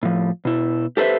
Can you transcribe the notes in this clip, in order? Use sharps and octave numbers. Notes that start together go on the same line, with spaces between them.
A2 F3
B2 E4
G4 A4 B4 C5 E5